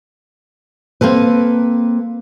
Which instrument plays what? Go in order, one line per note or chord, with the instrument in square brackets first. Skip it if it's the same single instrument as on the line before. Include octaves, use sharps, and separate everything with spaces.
[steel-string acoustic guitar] A#3 C4 A4 B4